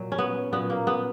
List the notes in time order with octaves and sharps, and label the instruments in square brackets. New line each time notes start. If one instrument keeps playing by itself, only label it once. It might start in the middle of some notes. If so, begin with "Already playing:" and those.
Already playing: [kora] A#2 F#3
C#4
B3
A#2 F#3 B3
A#3
B3